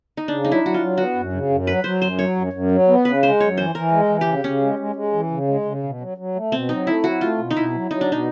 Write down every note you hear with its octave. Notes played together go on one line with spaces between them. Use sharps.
D#4
C#3 D4
F#3 D#4
E4
F#3 F#4
F4
F#3
B3 F#4
F#2
C#3
F#2
F#3 B4
F#3 C5
F#2 C5
F#3 C#5
F#2
F#2
F#3
B3
C#3 B4
G#3 C5
F#2 C#5
E3 C5
E3 A#4
G#3
E3
G4
C#3
C#3 C#4
G#3
G#3
G#3
E3
C#3
G#3
C#3
B2
F#3
F#3
A3
B2 C4
F#3 D#4
A3 E4
F#3 F#4
A3 F4
B2
D#4
B2 E4
F#3
F#3 D#4
D4
B2 D#4